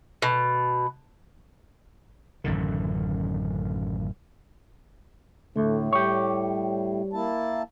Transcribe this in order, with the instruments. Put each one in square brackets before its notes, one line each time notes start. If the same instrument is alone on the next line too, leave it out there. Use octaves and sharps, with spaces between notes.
[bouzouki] B2
[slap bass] A1 F#2 D3 D#3
[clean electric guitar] D2 [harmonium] A2 [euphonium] A3
[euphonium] G3 [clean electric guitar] G4 C#5
[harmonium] A#3 E4 A5